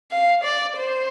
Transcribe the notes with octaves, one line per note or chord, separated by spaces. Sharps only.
F5
D5
C5